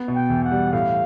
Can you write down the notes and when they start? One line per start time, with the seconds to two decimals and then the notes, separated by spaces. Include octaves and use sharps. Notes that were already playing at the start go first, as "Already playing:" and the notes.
Already playing: B3
0.08 B2
0.15 G5
0.30 E2
0.44 F#5
0.52 G3
0.72 A2 F5